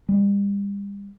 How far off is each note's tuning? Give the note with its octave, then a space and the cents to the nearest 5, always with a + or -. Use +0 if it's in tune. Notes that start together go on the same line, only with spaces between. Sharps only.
G3 +40